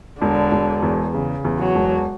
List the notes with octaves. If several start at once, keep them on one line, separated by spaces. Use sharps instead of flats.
E1 D3
E1
E2
C#3
E2
F#3
E1